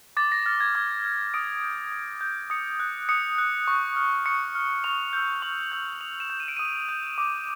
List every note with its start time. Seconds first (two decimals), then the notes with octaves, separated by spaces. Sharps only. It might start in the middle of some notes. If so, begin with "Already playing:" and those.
0.17 D6 A6
0.32 A#6
0.46 F6 A6
0.60 G#6
0.75 D6 G#6
1.05 F6
1.34 D#6 D7
1.63 G6
1.92 D#6
2.21 G6
2.50 D#6 C#7
2.80 F#6
3.09 D#6 C#7
3.38 F#6
3.68 C#6
3.96 F6
4.26 C#6 C#7
4.55 F6
4.84 C#6 F7
5.13 E6 G6
5.42 C#6 F#7
5.72 E6 G6
6.01 D#6 F7
6.20 E7
6.30 G6
6.40 D#7
6.48 D7
6.57 D#6 D#7
6.89 G6
7.18 D6